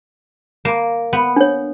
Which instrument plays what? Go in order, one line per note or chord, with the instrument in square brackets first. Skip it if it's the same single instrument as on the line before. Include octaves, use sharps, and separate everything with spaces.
[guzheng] A#3
B3
[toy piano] D4 C#5